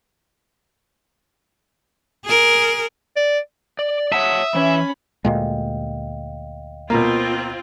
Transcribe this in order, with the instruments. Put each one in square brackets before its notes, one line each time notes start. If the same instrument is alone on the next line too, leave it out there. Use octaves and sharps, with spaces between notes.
[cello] G#4 A#4
[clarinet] D5
[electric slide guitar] D5
[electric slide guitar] C#5 F#5 A5 [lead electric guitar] E5 [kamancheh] D#6
[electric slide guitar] E3 [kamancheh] C#4 B5
[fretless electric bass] D2 A#2 G#3 [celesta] D#5 F5 G5
[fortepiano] B2 A#3 [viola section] C4 F4